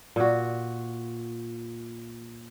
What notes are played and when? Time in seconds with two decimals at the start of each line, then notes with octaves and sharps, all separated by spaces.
0.16 A#2 F#4